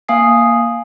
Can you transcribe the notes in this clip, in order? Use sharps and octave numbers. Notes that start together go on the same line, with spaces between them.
A#3 F5 G#5 D#6 C7